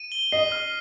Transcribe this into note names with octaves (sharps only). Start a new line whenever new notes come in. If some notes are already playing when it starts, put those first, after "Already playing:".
Already playing: D#7
G7
D#5 C7
F6